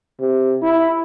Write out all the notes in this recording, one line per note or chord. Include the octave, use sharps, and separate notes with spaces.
C3
E4